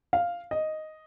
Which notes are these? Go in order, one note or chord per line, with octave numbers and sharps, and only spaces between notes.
F5
D#5